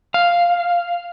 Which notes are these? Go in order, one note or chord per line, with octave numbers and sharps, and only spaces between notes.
F5